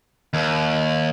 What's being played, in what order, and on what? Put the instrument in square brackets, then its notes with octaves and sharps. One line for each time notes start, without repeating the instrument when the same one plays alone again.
[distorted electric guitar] D#2